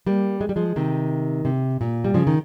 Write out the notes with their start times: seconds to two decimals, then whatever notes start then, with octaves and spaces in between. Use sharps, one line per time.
0.06 G3 A#3
0.41 G#3
0.49 G3
0.56 F3 G#3
0.76 C3 D#3
1.45 C3
1.81 A#2
2.04 G3
2.14 C#3 F3
2.27 D#3